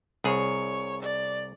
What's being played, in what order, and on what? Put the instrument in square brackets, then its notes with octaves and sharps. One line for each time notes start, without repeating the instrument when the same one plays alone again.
[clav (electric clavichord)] C2 G#4 [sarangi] C#5
[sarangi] D5